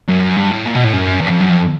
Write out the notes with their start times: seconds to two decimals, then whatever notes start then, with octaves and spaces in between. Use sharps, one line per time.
0.09 F#2
0.37 G2
0.51 A2
0.65 A#2
0.75 B2
0.84 A2
0.93 F#2
1.21 E2
1.27 F#2
1.31 F2
1.40 F#2
1.50 F2